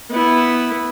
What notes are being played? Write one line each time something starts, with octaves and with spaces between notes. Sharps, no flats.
B3 E4